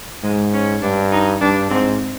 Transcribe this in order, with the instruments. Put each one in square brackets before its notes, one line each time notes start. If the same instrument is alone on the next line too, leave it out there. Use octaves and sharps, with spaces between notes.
[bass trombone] G#2 [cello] G#3
[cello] C#4
[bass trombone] G2 [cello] D4
[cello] D#4
[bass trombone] G2 [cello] D4
[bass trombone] G#2 [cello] C4